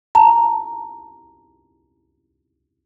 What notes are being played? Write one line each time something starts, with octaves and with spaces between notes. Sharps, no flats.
A5 A#5